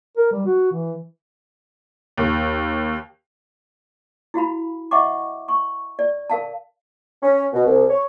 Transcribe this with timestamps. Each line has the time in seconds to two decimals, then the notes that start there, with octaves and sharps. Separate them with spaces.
0.17 A#4
0.32 G3
0.46 F#4
0.72 E3
2.18 D#2
4.34 E4 F#4 F5 B5
4.91 D#5 E5 F#5 G5 C#6 D6
5.48 C#6
5.99 D5
6.30 A#4 F5 A5
7.22 C#4
7.53 B2
7.66 C2
7.90 C#5